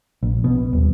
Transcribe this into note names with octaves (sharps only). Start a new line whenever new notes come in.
A#1
B2
D#1